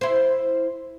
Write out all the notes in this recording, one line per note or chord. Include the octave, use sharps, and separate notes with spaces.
E4 C5